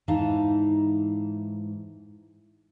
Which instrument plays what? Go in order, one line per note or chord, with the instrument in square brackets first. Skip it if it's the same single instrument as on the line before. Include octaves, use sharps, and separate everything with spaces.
[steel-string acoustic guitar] G#2 E3 D#4 E4 F5 A5